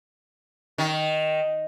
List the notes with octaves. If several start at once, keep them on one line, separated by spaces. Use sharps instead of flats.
D#3